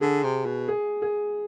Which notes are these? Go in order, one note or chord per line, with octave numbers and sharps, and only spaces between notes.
D3 G#4
C3
B2
G#4
G#4